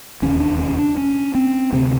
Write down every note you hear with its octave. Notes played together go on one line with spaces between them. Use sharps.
E1 D#2 C#3 C#4
D4
C#4
D4
C#4
C4
D2 C3 C4